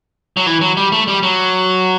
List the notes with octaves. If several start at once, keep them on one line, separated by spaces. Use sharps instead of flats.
F#3
E3
F#3
G3
A3
G3
F#3